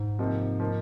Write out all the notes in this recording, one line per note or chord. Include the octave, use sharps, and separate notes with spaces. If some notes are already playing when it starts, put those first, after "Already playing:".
Already playing: G#2
C3 F3 A#3 D#4
F3 A#3 D#4